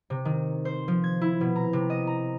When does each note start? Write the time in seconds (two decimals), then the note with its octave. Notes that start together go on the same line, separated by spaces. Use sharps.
0.10 C3
0.25 D#3
0.65 C5
0.88 F3
1.04 G#6
1.21 E4
1.41 B2
1.56 A#5
1.73 C3
1.90 D#5
2.07 A#5